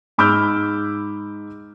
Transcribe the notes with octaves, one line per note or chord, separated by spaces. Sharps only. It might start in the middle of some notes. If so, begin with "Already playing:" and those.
G#2 B5 D6 E6 F6 G6